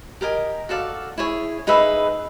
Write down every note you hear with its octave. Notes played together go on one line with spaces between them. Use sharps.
G4 A#4 D#5 G#5
F#4 A4 D5 F5
E4 G#4 C#5
D#4 G#4 B4 E5